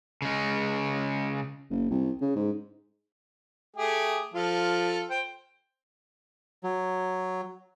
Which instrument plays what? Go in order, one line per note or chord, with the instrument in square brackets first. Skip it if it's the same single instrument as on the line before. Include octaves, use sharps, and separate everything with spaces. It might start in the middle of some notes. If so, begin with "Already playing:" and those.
[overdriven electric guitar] C#3 G#3
[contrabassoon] F#1
C2
C#3
G#2
[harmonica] A3 G4 G#4
F3 F4 A4
C5 G5
[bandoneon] F#3